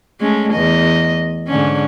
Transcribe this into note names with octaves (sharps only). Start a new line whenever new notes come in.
G#3 A3 C#4
E2 D#5
G#2 D3 C#4